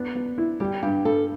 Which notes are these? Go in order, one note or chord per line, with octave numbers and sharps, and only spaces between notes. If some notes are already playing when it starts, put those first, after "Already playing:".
Already playing: B3 D4
B3
E4
G3 G4
G2 G4
G2 A4